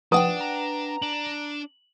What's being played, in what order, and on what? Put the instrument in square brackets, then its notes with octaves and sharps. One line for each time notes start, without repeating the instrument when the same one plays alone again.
[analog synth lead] F3 [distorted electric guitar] D4 [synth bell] B4 F#5 G5 [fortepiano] D#6
[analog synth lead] A#5
[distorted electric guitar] D4 [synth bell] F#7